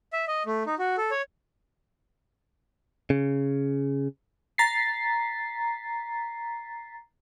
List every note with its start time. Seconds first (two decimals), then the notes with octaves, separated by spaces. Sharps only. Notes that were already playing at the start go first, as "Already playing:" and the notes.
0.13 E5
0.28 D#5
0.46 A3
0.67 D#4
0.79 F#4
0.97 A4
1.11 C#5
3.10 C#3
4.58 A#5 A6 B6 C7